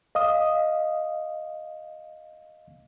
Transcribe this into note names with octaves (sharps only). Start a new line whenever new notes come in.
D#5 F5 D#6